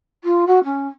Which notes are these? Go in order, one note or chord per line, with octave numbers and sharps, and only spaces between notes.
F4
F#4
C#4